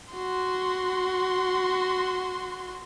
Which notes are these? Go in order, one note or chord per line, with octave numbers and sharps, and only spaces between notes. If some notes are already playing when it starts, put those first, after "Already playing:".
F#4 C6